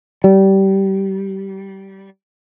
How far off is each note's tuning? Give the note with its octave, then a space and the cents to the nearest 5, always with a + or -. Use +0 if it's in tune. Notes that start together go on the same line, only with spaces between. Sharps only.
G3 -20